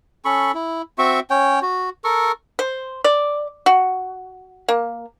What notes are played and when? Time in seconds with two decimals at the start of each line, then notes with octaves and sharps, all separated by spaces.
0.25 C#4 A4 B5 C#6
0.54 E4
0.98 C4 F#4 E5 C#6
1.30 C#4 C#5 G5
1.62 F#4
2.04 A4 A#4 C#6
2.59 C5
3.04 D5
3.66 F#4
4.68 A#3